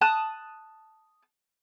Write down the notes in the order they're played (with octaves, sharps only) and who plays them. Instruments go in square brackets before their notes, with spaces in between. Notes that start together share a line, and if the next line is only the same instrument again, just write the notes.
[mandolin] A5 D#6 F#6